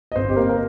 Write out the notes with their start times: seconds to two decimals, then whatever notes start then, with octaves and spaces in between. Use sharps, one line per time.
0.12 D#5
0.16 G1 C4 C5
0.29 G4
0.36 A#3 A#4
0.49 A#4